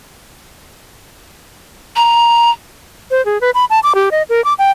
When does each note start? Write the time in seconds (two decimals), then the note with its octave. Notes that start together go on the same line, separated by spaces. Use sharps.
1.96 A#5
3.11 C5
3.25 G#4
3.41 B4
3.54 B5
3.70 A5
3.83 D6
3.95 G4
4.11 D#5
4.29 A#4
4.44 D6
4.59 G5